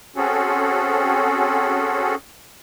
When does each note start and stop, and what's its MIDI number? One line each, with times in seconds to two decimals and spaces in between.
0.16 2.15 60
0.16 2.15 61
0.16 2.15 66
0.16 2.15 68
0.16 2.15 69